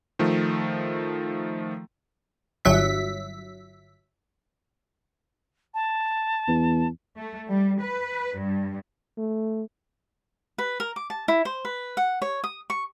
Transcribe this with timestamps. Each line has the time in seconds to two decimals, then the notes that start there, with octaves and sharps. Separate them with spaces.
0.19 D#3 F3 A3
2.65 G1 G2 F#3 E5 B6
5.74 A5
6.48 E2
7.17 A3
7.49 G3
7.81 B4
8.39 G2
9.18 A3
10.58 B4
10.80 A#4
10.96 D6
11.10 A5
11.28 E4
11.45 C5
11.65 B4
11.97 F#5
12.22 C#5
12.44 D#6
12.70 C#6